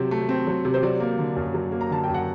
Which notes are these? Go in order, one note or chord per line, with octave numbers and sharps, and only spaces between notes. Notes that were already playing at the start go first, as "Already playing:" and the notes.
Already playing: C3 F#3 C4
A3
C4
F#3
C3
C5
F#3 D5
A#3
D3
F#2
F#3
A#3
A#5
D3 A5
F#2 G5
F#5